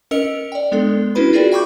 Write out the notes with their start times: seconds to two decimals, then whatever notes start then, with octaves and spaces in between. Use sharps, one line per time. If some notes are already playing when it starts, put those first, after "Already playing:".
0.11 C#4 A#4 D#5 E6 C#7 F7
0.52 D5 G5
0.72 G#3 B3 D4 A4
1.15 C#4 D4 E4 F#4 B4 B5
1.33 F4 F#4 G#4 A#4 D5 G5
1.52 E5 G5 B5 C#6 D6 G6